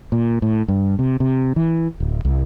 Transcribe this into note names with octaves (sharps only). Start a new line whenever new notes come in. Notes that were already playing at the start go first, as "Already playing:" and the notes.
A#2
A2
G2
C3
C3
E3
D1
C2